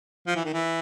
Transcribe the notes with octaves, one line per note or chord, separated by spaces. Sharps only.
F3
E3
D#3
E3